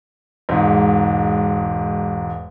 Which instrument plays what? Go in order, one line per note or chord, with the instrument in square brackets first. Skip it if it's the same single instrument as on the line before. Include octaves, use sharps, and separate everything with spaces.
[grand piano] E1 G#2